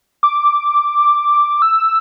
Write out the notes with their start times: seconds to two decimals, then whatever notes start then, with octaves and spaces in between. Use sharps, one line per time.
0.23 D6
1.62 E6